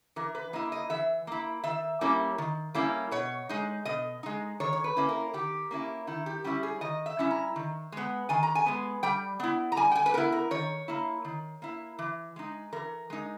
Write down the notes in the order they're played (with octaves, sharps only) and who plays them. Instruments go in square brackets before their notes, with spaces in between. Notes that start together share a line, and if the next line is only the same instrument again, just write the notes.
[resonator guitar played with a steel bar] E3 A#4
B4
A#3 E4 D#5
D#5
E3 E5
A#3 E4
D#3 E5
G3 A#3 C#4 E4
D#3
G3 A#3 C#4 E4
B2 C#5
G#3 D#4
B2 D#5
G#3 D#4
D#3 C#5
C#5
B4
A#3 C#4 E4
A#4
D#3 G4
A#3 C#4 E4
D#3 E4
G4
G3 C#4 E4 G4
G#4
D#3 D#5
E5
G3 C#4 E4
A#5
D#3
G#3 B3
D#3 G#5
A#5
G#5
G#3 B3
G3 G5
B3 E4
A#5
G3 G#5
G5
G#5
B4
B3 E4 A#4
A#4
D#3 C#5
A#3 E4
D#3
A#3 E4
E3
G#3 D#4
E3 A#4
G#3 D#4